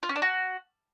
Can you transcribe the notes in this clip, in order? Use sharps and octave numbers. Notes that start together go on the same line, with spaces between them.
F4
C#4
D4
F#4